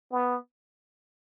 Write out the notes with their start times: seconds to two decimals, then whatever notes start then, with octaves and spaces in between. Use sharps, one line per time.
0.12 B3